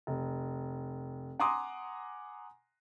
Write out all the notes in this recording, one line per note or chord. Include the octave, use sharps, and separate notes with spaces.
F1
F#5 G#5 A#5 C6 D6 D#6